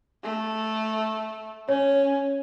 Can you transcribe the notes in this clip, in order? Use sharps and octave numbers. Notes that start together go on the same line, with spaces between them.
A3
C#4 C#5